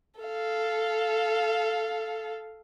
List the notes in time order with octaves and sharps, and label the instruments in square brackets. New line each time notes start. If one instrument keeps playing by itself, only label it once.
[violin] A4 F5